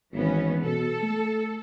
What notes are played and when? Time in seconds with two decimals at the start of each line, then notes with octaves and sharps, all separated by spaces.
0.14 G#1 E3 B3 C#4
0.63 B2 A4
1.03 A3